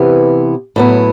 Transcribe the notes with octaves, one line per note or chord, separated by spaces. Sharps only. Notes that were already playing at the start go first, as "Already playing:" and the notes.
Already playing: C3 E3 B3
A2 F#3 B3